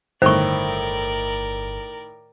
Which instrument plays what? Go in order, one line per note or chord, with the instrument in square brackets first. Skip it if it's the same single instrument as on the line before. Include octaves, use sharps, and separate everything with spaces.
[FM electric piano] G1 [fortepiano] A2 D#3 [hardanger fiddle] A#4 D5 [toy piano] C5 C#6